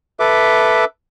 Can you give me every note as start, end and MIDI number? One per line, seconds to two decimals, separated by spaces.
0.20 0.85 69
0.20 0.85 71
0.20 0.85 76
0.20 0.85 86